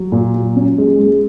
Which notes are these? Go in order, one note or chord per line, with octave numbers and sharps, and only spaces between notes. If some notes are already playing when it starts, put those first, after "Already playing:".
Already playing: F#3
A#2
F#3
C#4
G#3
G#3